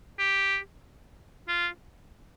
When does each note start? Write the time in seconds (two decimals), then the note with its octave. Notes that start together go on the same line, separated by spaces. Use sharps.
0.19 G4
1.48 F4